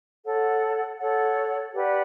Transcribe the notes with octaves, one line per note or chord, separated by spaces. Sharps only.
A4 C#5 F#5
A4 C#5 F#5
G4 B4 D5 F#5